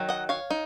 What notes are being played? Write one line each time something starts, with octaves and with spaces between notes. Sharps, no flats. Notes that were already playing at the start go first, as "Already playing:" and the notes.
Already playing: D#3 F#3
D#5 F#5
C#5 F5
D#4